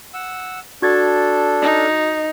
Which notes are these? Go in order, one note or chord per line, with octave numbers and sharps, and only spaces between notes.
F#5 E6
D4 F#4 A4 G#6 A6
D#4